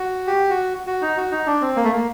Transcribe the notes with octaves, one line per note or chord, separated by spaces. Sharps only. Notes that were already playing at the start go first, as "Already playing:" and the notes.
Already playing: F#4
G4
F#4
F#4
D#4
F#4
D#4
D4
C4
A#3
A3
A#3